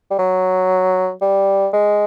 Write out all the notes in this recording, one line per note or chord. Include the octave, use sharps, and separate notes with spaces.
G3
F#3
G3
G#3